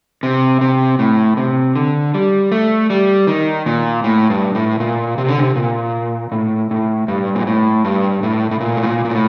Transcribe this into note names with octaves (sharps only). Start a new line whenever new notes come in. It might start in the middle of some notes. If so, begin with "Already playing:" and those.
C3
C3
A2
C3
D3
G3
A3
G3
D#3
A#2
A2
G2
A2
A#2
C3
D3
C3
A#2
A2
A2
G2
A#2
A2
G2
A2
A2
A#2
A2
A#2
A#2
A2